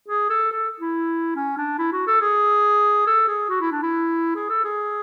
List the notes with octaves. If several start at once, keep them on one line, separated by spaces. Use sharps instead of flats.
G#4
A4
A4
E4
C#4
D4
E4
F#4
A4
G#4
A4
G#4
F#4
E4
D4
E4
G#4
A4
G#4